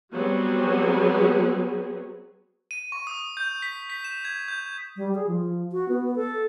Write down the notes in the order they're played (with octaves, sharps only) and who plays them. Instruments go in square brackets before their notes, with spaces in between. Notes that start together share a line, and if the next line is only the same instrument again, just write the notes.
[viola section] F#3 G3 B3 C4 G#4
[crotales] D#7
C#6
D#6
G6
B6
B6
E7
G#6
G6
[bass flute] G3
G#4
F3
F#4
B3
A4